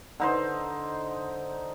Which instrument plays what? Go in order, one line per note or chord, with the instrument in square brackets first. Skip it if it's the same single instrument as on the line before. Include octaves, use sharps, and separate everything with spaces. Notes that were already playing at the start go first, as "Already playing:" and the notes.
[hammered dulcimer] D3 D#4 C5